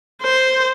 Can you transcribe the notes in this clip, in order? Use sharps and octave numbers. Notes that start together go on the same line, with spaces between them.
C5